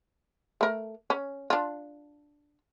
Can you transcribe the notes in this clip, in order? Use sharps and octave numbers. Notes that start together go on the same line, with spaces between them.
A3 A#4
C#4
D4 F4